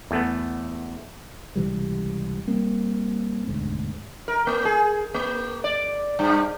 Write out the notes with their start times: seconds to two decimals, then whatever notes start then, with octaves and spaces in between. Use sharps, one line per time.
0.11 E2 A3 B3
1.56 C#2 C3 E3 G3
2.48 G3 A#3 C4
3.47 E1 D2 G#2
4.28 A#4
4.47 A#3
4.65 G#4
5.14 A#3
5.64 D5
6.19 G2